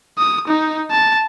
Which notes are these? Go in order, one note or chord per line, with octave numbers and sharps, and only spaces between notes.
D#6
D#4
A5